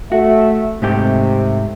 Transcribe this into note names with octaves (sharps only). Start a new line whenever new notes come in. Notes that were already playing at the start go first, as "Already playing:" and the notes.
A3 F#4 E5
G#2 C3 A3 G4